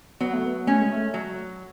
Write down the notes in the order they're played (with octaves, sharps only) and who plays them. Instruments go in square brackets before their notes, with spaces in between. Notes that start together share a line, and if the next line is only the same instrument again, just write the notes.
[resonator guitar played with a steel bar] F#3 [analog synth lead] B3
[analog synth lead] A3
B3
[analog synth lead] A3 [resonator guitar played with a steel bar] C#4
[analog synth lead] G#3
A3
[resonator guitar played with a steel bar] F#3